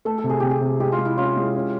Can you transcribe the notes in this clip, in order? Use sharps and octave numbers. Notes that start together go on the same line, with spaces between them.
A3 A4
A4
C3
G#4
C3 G4
G#4
C3
G#3 G4
F4
G#3
E4
C#4 F4
G#3
C#4